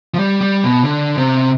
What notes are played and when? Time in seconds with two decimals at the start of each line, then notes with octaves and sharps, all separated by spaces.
0.14 F3
0.19 G3
0.41 G3
0.63 B2
0.84 D3
1.17 C3